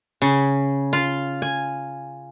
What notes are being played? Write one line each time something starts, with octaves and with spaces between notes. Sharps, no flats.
C#3
F4
G#5